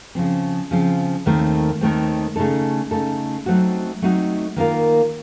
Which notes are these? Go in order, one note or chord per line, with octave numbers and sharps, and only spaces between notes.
C#3 F3 C4
C#3 F3 C4
D#2 D#3 A3 C4
D#2 D#3 A3 C4
C#3 A3 D#4 A4
C#3 A3 D#4 A4
F#3 A3 C4 D#4 F#4
F#3 A3 C4 D#4 F#4
D#3 A#3 F4 A#4